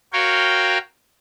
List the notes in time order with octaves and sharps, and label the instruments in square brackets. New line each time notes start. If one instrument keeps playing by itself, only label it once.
[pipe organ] F#4 A#4 C#5 F5 G5